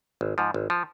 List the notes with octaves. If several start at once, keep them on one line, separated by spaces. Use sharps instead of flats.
G#1
G#2 F3
G#1
F3